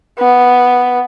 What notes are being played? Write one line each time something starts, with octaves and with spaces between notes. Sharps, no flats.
B3